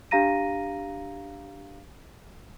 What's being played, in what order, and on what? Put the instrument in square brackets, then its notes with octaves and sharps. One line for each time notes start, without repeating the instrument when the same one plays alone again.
[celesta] D4 G4 F5 A#5 A#6 D#7